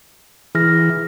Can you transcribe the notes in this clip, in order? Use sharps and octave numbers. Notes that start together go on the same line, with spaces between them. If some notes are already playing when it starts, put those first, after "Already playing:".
E3 G#4 F6 A#6